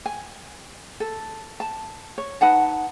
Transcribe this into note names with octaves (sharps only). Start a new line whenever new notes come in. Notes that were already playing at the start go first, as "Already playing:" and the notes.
G#5
A4
A5
C#5
D#4 B4 F#5 A5